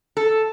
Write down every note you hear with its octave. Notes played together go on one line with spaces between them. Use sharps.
A4